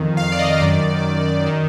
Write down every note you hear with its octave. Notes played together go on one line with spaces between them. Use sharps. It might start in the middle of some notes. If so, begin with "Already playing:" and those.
Already playing: F2 D#3
F5
D5
D#5
F#2 D#3 D5
D#3